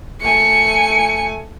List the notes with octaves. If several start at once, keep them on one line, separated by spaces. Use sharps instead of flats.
A3 G#5 C#7